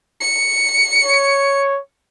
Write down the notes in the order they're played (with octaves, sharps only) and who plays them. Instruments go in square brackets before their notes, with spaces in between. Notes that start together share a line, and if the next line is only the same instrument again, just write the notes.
[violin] C#7
[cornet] C#5